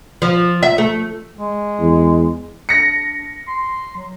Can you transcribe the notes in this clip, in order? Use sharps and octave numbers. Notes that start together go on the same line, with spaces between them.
F3
E5
A3
G#3
E2
D4 A#6 C#7
C6
F#3